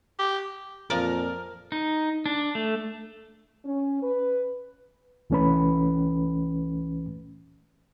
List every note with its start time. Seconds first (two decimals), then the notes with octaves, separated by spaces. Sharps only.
0.19 G4
0.90 F2 A#2 F3 A#4 D5
1.72 D#4
2.26 D4
2.55 A3
3.65 C#4
4.03 B4
5.30 C2 E3 A3 C#4 B4 B5